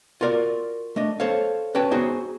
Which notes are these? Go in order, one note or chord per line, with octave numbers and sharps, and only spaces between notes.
F4 F#4 A#4 D5
A3 D4 D#5
A4 C5 C#5 F5
C#4 F#4 B4 C#5 G5 A5
B3 D#4 F#4 G#4 C5